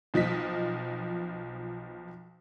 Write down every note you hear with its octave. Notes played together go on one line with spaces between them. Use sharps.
B1 F3 D#5 B6